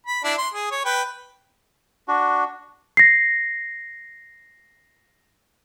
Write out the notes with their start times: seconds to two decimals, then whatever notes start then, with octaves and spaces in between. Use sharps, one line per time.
0.07 B5
0.24 D4 E4
0.38 C6
0.54 G#4
0.71 C#5
0.85 B4 G5
2.08 D4 F#4
2.97 A#6 C7